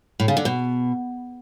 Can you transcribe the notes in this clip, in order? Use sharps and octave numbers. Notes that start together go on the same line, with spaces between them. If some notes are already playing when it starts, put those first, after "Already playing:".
A2
C#3
D3
B2